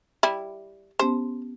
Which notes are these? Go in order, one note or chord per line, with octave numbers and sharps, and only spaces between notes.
G3 E4
B3 C#4 G4 C5